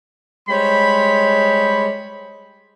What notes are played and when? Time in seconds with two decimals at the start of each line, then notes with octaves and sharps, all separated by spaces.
0.49 G3 G#3 C5 C#5 B5